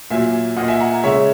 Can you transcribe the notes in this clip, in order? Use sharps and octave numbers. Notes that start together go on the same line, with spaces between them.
A#2 F#3 A#3 E5 G#5
A#2 A#3 D#5 F#5
E5 G#5
F#5 A#5
C#3 G#3 C#5 E5